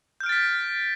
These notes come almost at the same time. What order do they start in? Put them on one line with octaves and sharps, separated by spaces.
G6 F6 D7 A6 B6